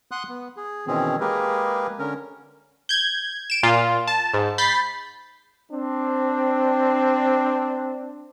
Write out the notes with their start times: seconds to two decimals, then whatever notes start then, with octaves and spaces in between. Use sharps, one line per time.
0.11 F#5 C6 D#6 F#6
0.29 B3
0.57 G#4
0.87 B2 D#3 E3 C4 C#4 G#4
1.20 G#3 A#3 G4 G#4 A#4 B4
1.99 D3 C#4 A#4
2.89 G6 G#6
3.50 D7 E7
3.63 A#2 F4
4.08 A5
4.34 G#2
4.58 B5 G6 A6 B6 C7
5.72 C4 D4